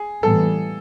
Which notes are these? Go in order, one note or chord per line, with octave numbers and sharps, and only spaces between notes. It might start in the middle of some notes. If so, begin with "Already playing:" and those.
Already playing: G#4
A2 E3 G3 B3 A4